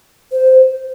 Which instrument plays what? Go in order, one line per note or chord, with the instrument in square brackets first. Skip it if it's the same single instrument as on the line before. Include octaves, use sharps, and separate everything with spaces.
[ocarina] C5